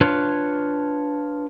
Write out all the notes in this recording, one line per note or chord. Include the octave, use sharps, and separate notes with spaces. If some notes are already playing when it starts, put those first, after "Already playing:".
D4 F4 B4 C#5